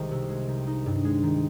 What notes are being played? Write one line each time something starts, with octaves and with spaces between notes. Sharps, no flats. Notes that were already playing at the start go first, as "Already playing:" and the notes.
Already playing: C2 D#3 G#3
C3
G#3
D#3
D#4
G2
G#3
D#3